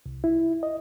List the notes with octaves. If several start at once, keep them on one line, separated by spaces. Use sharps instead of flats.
C2
E4
D#5